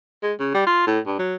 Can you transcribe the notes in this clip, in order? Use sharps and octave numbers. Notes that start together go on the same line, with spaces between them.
G#3
C#3
G3
F4
A2
G2
F#3